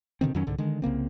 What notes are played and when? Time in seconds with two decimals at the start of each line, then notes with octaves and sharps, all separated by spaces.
0.21 B2 D3 D#3 C4
0.35 F2 D#3 F#3 C#4
0.47 C2 G#2 D3
0.58 D3 D#3 G#3
0.82 C2 C#3 A#3 C4